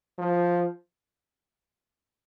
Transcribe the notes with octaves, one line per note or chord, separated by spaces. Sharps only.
F3